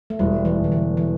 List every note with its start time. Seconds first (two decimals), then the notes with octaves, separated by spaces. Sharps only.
0.10 A3
0.19 E1 G3
0.45 E3
0.58 E1
0.64 D3
0.72 E3
0.97 E3